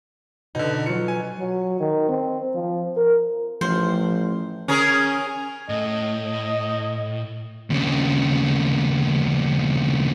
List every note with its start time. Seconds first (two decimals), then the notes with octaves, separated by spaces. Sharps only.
0.55 B2 D3 D#4
0.86 F#3 F4 C#7
1.08 G#5
1.40 F#3
1.80 D#3
2.09 C4
2.55 F3
2.97 A#4
3.61 A1 F3 C5
4.68 C#4 G#4 A#4
5.69 A2 D#5
7.70 D#2 C#3